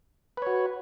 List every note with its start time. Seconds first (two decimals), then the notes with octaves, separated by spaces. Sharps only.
0.37 B4
0.42 C#5
0.47 F#4